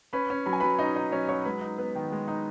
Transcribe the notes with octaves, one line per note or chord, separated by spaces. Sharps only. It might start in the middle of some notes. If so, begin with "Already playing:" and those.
C#4 B4 B5
C#4
F#3 B5
G#5
F#3 B4 B5
C#4 D#4 D#5
C#4 D#4 D#5
F#3 C#4 C#5
F#3 C#4 C#5
G#3 B4
D#4
B3 B4
D#3
G#3
D#4